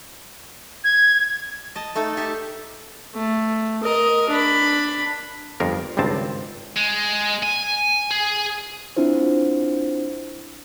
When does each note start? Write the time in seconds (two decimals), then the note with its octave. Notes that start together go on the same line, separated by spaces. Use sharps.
0.84 G#6
1.76 D#5 A5
1.96 A3 D#4 A4 A5
2.17 D#4 G4 E5
3.14 A3
3.83 A#4 D#5
4.29 D4 B5
5.60 G1 F2 A#4
5.97 G#1 C#2 G2 C4 A5
6.77 G#3
7.43 G#5
8.11 G#4
8.97 C4 D4 E4 F4 C5